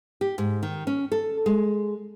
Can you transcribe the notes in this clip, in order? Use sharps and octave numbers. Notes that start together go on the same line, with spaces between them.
G4
G#2
D#3
C#4
A4
G#3